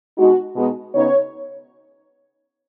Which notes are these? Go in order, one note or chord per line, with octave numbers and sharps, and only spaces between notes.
B2 G#3 B3 D#4 F#4
B2 G#3 B3 D#4
C#3 B3 D#4 C#5